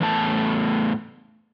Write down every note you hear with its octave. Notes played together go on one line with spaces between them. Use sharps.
E2 A2 A3 A5